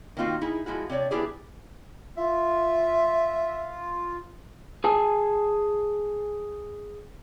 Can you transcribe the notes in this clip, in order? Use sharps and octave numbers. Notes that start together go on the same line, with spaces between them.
D#3 A#3 C4 D#4 F4 F#4
D#4 E4 G#4
F3 G#3 E4 F#4
C3 D4 C#5 D5
B3 D4 E4 G4 G#4
F4 E5
G#4 G#5 A5